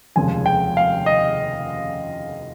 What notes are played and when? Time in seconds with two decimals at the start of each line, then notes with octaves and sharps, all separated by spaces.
0.16 F1 D#2 C#3 F3 G#3 G#5
0.46 G5
0.77 F5
1.06 D#5